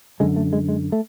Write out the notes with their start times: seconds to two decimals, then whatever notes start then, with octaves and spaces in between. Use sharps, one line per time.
0.20 F#2 D3 G#3
0.36 A3
0.53 G#3
0.69 G#3
0.92 A3